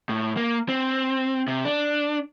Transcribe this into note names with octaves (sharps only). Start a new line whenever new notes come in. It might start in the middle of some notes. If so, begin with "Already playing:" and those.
A2
A#3
C4
C3
D4